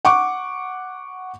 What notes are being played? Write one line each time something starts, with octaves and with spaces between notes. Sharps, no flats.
F#5 C#6 D6